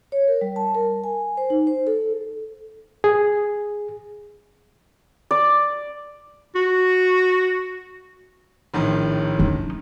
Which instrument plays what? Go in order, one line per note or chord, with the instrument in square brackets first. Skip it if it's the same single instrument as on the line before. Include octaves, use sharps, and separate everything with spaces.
[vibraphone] C#5
A#4
G3
A5
A#4
G#5
C5
D#4
C5
A4
[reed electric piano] G#4
[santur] D5
[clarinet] F#4
[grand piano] A#1 A2 D#3
[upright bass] C#4 D#4